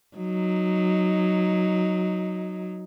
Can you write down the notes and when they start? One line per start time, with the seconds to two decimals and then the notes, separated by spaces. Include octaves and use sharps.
0.17 F#3 D#4